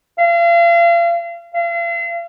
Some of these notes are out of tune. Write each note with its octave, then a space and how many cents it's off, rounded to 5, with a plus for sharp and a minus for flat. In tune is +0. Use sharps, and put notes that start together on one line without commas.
F5 -35
F5 -40